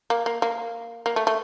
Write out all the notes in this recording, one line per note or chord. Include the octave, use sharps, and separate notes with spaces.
A#3
A#3
A#3
A#3
A3
A3